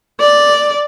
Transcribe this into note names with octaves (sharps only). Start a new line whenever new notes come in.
D5